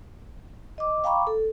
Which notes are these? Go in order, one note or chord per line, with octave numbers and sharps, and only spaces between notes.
D#5 D6
F5 G5 A#5 B5 C#6 D6
A4